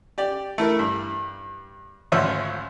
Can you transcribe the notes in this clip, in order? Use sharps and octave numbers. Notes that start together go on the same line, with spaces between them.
G4 D5
A3 E4 A#4
G2
G#1 D2 F3 F4 C#5 E5